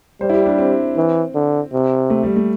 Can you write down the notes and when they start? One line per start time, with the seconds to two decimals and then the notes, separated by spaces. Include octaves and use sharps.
0.21 G3 C5
0.29 E4
0.34 G4
0.46 D4
0.58 C4
0.97 E3
1.34 D3
1.73 C3
2.10 A3
2.23 G3
2.36 A3